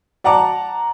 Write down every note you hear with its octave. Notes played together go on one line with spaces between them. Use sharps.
D5 F#5 A5 A#5 D6